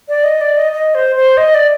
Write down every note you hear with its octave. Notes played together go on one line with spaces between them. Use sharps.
D5
D#5
D5
D#5
D#5
C5
C5
D#5
D5